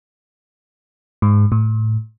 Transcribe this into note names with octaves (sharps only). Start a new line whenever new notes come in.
G#2
A2